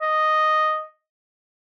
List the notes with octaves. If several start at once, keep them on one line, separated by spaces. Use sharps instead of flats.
D#5